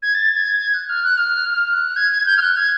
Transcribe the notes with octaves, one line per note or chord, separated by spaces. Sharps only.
G#6
A6
G#6
G#6
F#6
F6
F#6
F6
F6
F#6
G#6
G#6
G6
F6
F#6
G#6